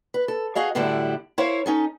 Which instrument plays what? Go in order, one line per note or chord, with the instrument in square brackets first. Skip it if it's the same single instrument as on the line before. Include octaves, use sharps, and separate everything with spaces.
[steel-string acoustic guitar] B4
A4
F#4 G#4 D#5 F5
F#2 A2 D3 G3 D4 E4
E4 A#4 C5 C#5 F5
C#4 D#4 A4